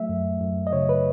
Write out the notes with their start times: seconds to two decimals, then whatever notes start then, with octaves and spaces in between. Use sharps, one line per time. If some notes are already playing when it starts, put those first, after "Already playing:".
Already playing: F#3 A3 E5
0.09 F#2
0.41 F#2
0.67 D#5
0.73 C#3 C#5
0.89 B4